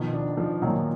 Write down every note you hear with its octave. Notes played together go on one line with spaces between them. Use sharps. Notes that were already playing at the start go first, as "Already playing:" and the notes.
Already playing: B2 D#3 F3
D4
F3
A#2 D#3 F#3